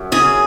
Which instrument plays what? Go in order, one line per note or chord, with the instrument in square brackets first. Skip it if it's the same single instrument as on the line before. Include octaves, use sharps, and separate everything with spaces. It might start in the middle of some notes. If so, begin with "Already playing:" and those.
Already playing: [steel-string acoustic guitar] F#2
C#3 G#4